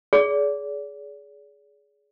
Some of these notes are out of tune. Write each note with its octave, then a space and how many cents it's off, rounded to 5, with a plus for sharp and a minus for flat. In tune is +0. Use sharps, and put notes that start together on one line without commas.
G#4 +15 D5 -40